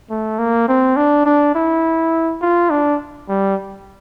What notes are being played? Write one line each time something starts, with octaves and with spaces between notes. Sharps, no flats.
A3
A#3
C4
D4
D4
E4
F4
D4
G3